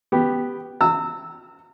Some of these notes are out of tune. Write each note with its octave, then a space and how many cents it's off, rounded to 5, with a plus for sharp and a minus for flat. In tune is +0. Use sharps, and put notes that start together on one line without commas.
B3 +0 G4 +0
A#5 -35 E6 -10